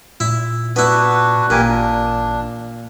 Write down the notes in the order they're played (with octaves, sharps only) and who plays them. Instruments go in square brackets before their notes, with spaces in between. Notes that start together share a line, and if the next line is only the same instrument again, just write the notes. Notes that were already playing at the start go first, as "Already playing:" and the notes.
[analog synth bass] A#2 [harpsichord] E4
[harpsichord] B3 E4 [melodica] D4 F#4 B4
[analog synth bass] A1 [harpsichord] A#2 [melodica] G4 A#4 G#5
[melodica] D4